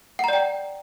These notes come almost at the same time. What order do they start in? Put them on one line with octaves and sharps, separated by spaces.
F#5 A#5 D5 G5